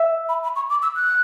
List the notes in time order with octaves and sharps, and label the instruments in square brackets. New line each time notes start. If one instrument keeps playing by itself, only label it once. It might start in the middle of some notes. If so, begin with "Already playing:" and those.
Already playing: [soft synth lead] E5
[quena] B5
B5
C#6
D6
E6
F#6